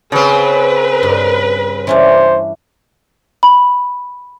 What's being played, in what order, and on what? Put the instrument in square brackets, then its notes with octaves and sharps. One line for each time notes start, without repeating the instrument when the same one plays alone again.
[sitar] C#3 C4 [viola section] B4
[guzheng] G2
[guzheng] E3 C#4 D4 [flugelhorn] C5
[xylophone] B5